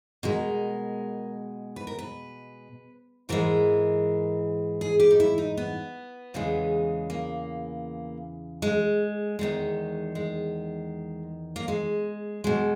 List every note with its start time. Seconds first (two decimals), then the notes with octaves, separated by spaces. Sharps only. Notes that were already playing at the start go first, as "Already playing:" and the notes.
0.23 B2 G#3 A#4
1.76 B4
1.87 A#4
1.99 B4
3.29 G#2 E3 G#3 A#4
4.81 G#4
5.00 G4
5.11 D#4
5.20 E4
5.38 D#4
5.57 B3
6.34 E2 C#3 E3 G#3
7.10 A#3
8.62 G#3
9.39 E2 D#3 G#3
10.15 G#3
11.56 A#3
11.68 G#3
12.44 B2 G#3